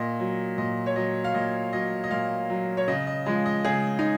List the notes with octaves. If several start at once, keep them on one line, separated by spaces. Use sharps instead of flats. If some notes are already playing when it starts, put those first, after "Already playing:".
Already playing: A#2 D#5
F#3
A#2 D#5
C#5
F#3 D#5
F5
A#2 D#5
F#3 D#5
D#5
A#2 F5
F#3
C#5
C#3 D#5
D#5
F3 G#3 D#5
D#5
C#3 G#4
D#4